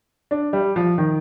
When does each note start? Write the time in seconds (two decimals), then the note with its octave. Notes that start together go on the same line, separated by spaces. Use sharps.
0.31 D4
0.53 G3
0.76 F3
0.98 D#3